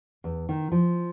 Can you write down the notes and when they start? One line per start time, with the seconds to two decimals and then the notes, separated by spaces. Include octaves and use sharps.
0.24 E2
0.49 D#3
0.72 F3